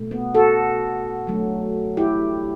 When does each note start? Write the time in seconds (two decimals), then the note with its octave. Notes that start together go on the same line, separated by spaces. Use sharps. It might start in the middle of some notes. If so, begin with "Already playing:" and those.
Already playing: B2 A3
0.11 B3
0.34 F#4 A4
1.27 D3 F#3 A3
1.97 E4 G4